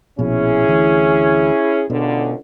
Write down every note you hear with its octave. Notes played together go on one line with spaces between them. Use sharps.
A#1 B2 C#4 E4 G#4
D2 E3
C#2 B2 D3